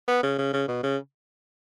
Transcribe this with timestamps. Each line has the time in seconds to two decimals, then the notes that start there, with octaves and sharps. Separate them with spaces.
0.08 B3
0.23 C#3
0.38 C#3
0.53 C#3
0.68 B2
0.83 C#3